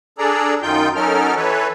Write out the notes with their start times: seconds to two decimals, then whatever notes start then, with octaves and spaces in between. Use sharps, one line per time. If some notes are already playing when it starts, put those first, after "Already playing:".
0.18 D4 G#4 A4 D5 A#5
0.63 F#2 D#3 D#4 F4 G5 G6
0.96 F#3 C#4 D#4 A4 A#4 F6
1.36 E3 A4 B4 C#5